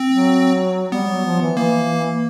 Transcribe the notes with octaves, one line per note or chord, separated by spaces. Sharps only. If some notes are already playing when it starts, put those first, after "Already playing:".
Already playing: C4
F#3
G3 B3
F#3
F3
E3
E3 A#3